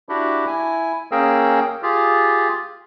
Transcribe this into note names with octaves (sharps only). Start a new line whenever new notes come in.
D4 E4 F#4 G4
E4 G#5
A#3 C#4 G#4 A#4 G5 E6
F4 G4 G#4